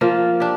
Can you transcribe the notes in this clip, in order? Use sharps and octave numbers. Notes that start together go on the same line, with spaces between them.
F3 A#3 F4
D4 G4